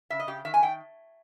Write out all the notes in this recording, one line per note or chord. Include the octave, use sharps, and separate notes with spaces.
C#3 E5
D#5
C#3 G4
D#3 E5
G#5
D#3 G5